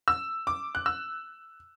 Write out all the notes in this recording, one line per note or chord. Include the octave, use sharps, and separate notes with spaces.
E6
D6
F#6
E6